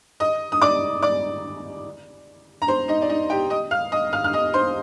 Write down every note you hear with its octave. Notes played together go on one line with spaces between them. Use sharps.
D#5 D#6
D#6
D5 D6
D5 D6
A#5
C5 C6
D#4 D#5
D5
D#4 D#5
G4 G5
D#5 D#6
F5 F6
D#5 D#6
F5 F6
F6
D#5 D#6
C5 C6